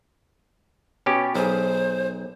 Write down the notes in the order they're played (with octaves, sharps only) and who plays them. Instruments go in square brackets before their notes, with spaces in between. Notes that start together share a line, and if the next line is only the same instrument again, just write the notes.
[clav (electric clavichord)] B2 C#4 G4
[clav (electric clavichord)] B1 G#4 [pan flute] C5